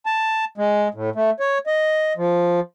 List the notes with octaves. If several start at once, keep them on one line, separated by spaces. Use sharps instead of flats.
A5
G#3
A2
A3
C#5
D#5
F3